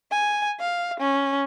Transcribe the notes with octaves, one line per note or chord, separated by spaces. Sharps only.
G#5
F5
C#4